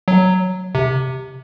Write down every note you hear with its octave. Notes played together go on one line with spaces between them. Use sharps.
F#3
C3